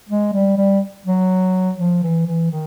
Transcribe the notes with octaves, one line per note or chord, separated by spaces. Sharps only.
G#3
G3
G3
F#3
F3
E3
E3
D#3